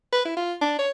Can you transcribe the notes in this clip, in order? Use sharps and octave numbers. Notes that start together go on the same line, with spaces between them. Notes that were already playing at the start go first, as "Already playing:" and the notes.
B4
E4
F4
D4
C#5